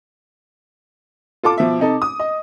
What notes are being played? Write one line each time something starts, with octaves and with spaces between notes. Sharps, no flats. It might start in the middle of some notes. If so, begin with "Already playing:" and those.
F4 A4 A5 D6
B2 F3 E5
C3 D#4 A4
D#6
D#5